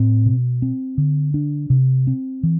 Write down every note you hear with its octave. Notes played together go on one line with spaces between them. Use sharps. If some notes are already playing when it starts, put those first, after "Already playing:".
Already playing: A2 C4
B2
C4
D3
D4
C3
C4
E3